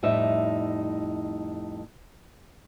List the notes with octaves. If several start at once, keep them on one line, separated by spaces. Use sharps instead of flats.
F2 A2 G3 D#4 E5